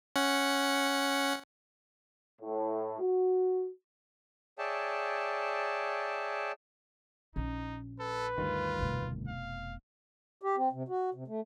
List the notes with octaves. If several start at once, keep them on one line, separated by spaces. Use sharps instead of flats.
C#4 F#5
A2
F#4
G#4 C#5 D5 E5 G5 A5
A#1 C#4 D#4
A4 B4
D2 G2 D#3 F4
F1 B2
F5
G4
C4
C3
F#4
C3
A3